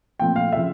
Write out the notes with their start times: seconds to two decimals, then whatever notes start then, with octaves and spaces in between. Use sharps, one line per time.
0.20 A#2 F3 A3 C4 G5
0.36 F5
0.52 C#3 F3 E5